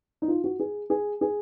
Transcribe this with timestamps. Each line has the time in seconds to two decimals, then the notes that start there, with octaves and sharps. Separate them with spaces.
0.22 D#4
0.28 F4
0.44 F#4
0.60 G#4
0.90 G#4
1.21 G#4